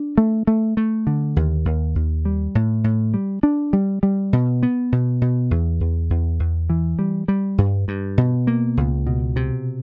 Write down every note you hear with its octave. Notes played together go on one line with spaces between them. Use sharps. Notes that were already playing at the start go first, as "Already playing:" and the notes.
Already playing: D4
A3
A3
A3
D3
D#2
D#2
D#2
G3
A2
A2
G3
D4
G3
G3
B2
B3
B2
B2
E2
E2
E2
E2
E3
G3
G3
G2
G2
B2
A#3
C#2
B2
C3